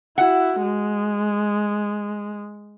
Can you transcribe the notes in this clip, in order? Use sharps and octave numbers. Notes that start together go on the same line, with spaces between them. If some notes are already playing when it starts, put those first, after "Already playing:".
E4 F#4 F#5
G#3